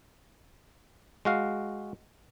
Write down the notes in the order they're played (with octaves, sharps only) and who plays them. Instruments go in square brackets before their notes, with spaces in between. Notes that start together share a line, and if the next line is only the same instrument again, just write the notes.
[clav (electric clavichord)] G#3 F#4 F5